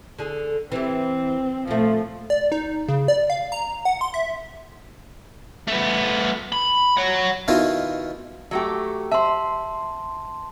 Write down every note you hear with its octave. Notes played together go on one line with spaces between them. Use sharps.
D3 G#4
E3 C4 G4
A#2 F3 A3
D5
D#4
C#3
D5
F5
A#5
F#5
C6
E5
A3 B3
B5
C#5 F#5
B2 D#3 E4 F4
F#3 A3 G4
C5 E5 A5 C6